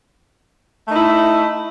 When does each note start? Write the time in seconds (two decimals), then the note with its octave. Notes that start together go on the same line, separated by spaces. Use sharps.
0.87 A3
0.91 D#4
0.96 E4